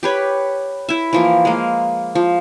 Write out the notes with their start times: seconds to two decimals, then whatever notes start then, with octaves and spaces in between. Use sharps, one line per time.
0.03 G4 B4 C#5
0.89 E4 E5
1.13 E3 F3 A#3
1.45 G#3 A#3
2.15 F3